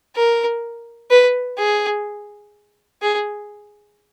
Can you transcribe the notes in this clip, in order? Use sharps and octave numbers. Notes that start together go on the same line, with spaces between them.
A#4
B4
G#4
G#4